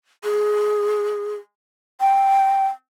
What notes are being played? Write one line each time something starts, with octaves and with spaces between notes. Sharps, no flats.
G#4
G5